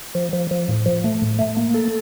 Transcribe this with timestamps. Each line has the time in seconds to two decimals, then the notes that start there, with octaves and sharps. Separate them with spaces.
0.15 F3
0.33 F3
0.51 F3
0.69 A2
0.86 F3
1.04 A3
1.22 A2
1.39 A3
1.57 A#3
1.74 A4